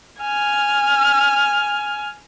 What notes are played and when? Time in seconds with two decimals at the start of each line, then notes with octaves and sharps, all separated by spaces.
0.22 G#5 F6